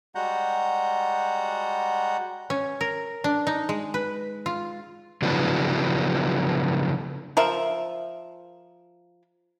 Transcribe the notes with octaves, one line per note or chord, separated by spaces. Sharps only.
G3 G#3 F#4 F#5 A#5 G6
C#4
A#4
D4
D#4
G#3
B4
F4
C#3 F3 F#3 B3 D4 E4
F3 A#4 E5